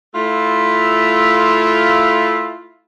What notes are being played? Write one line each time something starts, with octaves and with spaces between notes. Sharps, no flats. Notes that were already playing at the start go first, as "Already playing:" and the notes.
A3 E4 F4